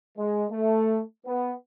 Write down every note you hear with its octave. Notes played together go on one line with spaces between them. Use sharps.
G#3
A3
B3